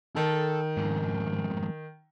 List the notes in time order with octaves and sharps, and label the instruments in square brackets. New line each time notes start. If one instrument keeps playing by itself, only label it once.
[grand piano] D#3 [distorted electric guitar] A4
[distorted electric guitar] F2 G#2